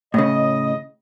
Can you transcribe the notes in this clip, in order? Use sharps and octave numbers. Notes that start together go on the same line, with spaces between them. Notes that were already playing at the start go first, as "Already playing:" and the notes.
A2 C#3 D#5